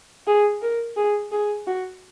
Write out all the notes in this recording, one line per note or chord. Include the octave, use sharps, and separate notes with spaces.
G#4
A#4
G#4
G#4
F#4